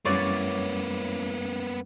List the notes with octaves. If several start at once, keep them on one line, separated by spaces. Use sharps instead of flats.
F#2 E3 G3 A#3 B3 C#4 C#5 D5